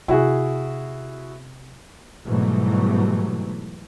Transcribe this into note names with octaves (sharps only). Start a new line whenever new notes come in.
C3 E4 F#4 G#4
G#2 B2 E3 F#3 G3 A3